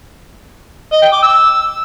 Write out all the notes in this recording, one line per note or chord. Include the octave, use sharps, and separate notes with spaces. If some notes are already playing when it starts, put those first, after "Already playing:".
D#5
G5
D6
E6